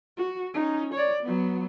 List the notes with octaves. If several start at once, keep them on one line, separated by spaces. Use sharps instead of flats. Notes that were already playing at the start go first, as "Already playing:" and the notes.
F#4
C#4 D#4
C#5 D5
F#3 B3